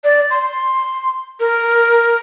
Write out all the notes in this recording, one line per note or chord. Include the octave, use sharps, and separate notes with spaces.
D5
C6
A#4